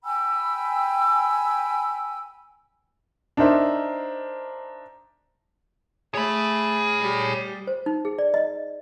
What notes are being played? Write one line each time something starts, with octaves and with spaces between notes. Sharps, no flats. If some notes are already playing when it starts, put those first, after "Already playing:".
G5 G#5 B5 E6
D4 D#4 A#4 C5 E5
A3 G#4 C#5 B5
G3
C5
D#4
G#4
D5
D#5